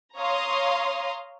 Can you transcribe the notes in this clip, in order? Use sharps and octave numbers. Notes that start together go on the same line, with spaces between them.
C#5 F5 A#5 C6 D#6